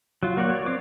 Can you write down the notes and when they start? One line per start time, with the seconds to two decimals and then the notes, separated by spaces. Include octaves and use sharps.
0.23 F#3 F4
0.37 A#3 F#4 C#5 D5 F#5
0.50 C#5 D5
0.66 C4 C#5 D6